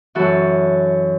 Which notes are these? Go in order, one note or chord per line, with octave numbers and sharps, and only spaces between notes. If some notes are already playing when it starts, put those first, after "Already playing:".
F#2 E3 F#4 A4